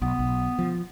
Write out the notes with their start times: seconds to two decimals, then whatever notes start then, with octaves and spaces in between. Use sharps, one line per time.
0.02 B1 B3
0.19 B1
0.58 F3